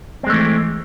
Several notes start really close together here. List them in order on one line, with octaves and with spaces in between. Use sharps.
C4 G#3 A3 E3